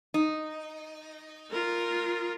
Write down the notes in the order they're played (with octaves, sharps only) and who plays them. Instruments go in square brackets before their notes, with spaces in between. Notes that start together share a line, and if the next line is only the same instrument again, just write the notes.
[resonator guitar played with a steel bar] D#4
[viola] F4 A#4